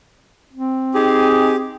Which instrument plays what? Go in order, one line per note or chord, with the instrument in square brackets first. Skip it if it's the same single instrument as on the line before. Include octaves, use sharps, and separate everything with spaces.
[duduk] C4
[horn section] D#4 G#4 [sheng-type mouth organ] G4